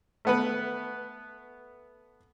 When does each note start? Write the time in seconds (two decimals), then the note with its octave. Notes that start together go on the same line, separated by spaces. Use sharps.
0.25 A3 B3 B4